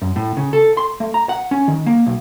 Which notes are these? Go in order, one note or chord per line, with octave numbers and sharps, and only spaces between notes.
F#2
A2
C#3
A4
C6
A3
A#5
F#5
C#4
D#3
A#3
B1